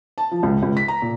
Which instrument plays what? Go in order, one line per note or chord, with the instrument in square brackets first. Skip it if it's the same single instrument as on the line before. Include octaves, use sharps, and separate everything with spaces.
[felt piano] A5
F3
C#2
C#2
B6
A#5
A#2